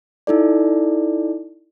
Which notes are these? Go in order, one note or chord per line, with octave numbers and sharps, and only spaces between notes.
D#4 E4 A4 D5